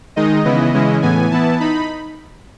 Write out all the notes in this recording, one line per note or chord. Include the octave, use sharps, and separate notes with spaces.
D#3 G#3 D#4 D#5
C#3 E3 B3 E4
C#3 E3 G#3 C#4 E4
A2 E3 B3 G#5
E3 B3 E4 A5
D#4 B5